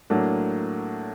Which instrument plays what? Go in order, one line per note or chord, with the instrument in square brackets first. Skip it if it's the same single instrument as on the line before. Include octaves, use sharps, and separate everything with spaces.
[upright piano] A2 F#3 A#3 D4